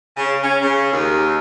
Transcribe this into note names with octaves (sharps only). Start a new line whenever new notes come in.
C#3
C#4
C#3
D#2